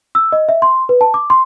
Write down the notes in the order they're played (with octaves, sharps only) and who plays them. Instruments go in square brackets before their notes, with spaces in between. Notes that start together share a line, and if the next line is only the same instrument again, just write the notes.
[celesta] E6
D#5
E5
C6
B4
A5
D6
C6